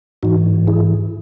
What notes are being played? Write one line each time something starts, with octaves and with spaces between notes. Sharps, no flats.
G#2 E3 D#4 F#4
E4 G#4